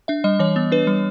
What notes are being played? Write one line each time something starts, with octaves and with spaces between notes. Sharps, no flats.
D4 E5
G3 D#5
E3 C#5
B3
D4 B4
G3